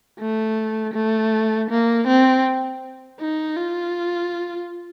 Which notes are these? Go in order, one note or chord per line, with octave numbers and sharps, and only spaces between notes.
A3
A3
A#3
C4
D#4
F4